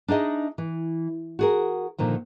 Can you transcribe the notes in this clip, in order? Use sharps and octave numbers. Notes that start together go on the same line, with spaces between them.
D4 D#4 G#4 D#5 E5
E3
F#4 G#4 A#4
A#2 D3 D#3 F3